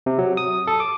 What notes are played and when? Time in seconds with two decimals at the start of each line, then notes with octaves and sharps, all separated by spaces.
0.06 C3
0.18 F#3
0.37 D#6
0.67 A4
0.80 D6